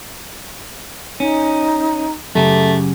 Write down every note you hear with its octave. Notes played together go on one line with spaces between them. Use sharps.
C#4 D#4
F#2 C#3 A3 G4